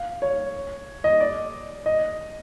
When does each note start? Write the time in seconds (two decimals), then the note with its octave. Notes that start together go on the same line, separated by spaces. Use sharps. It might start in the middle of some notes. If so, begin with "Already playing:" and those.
Already playing: F5
0.22 C#5
1.04 D#5
1.20 D5
1.86 D#5